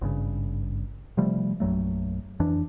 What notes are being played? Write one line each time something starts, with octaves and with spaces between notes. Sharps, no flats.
G#1 G2 C#3
C3 F3 G3 A3
A#1 F#2 F#3 A3
F2 E3 D4